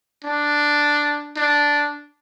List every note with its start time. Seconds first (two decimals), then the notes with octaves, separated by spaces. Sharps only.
0.25 D4
1.37 D4